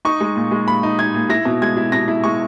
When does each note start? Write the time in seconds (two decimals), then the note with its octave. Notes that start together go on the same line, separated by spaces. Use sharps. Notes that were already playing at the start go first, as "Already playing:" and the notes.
0.05 D#4 C#6
0.20 G#3
0.36 A#2
0.51 G#3
0.67 A#2 B5
0.83 D#4
0.99 D#4 G#6
1.14 A#2
1.29 E4 A#6
1.45 B2
1.62 G#3 G#6
1.77 E4
1.92 B2 A#6
2.08 E4
2.24 G#3 C#6